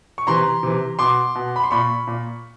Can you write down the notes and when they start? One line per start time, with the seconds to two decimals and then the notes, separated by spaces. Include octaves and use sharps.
0.18 C#6
0.27 C3 E3 A#5 C6
0.63 C3 E3
0.99 B2 C6 D6
1.35 B2
1.56 B5
1.64 C6
1.71 A#2 B5 C#6
2.07 A#2